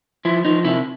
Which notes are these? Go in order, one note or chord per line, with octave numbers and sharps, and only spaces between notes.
F3 E4
F3 D#4
C3 E4